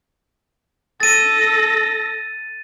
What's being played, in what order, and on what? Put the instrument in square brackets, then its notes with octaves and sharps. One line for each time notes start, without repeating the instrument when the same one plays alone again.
[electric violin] A4 A#6 [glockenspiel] A6 D#7